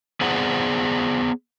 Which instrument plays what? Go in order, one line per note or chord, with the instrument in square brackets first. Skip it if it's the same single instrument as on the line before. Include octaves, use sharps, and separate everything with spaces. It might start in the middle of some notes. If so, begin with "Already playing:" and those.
[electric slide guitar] B3 G#4 C5 D5 F#5